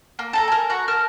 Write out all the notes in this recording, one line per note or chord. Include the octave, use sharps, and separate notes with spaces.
A#3
A4 A5 A#5
A#4 G#5
F#4 A#5
A#4 A5 F6